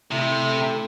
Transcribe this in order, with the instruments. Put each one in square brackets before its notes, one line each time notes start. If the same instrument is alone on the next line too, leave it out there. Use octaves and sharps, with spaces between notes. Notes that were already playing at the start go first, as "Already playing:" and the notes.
[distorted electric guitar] C3 [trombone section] A3 E4